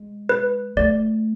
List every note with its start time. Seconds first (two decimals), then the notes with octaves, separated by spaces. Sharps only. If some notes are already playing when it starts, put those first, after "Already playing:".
Already playing: G#3
0.29 B4
0.77 A3 D5